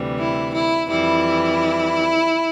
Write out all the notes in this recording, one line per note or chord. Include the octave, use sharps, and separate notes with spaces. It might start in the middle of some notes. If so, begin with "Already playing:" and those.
Already playing: D2 C3 E3 G3
E4
E4
F2 E3 G3 E4